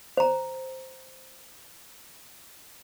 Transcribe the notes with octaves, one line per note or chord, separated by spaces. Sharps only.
C5 A#5